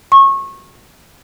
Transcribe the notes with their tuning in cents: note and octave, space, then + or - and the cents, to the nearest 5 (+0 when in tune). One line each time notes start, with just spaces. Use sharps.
C#6 -25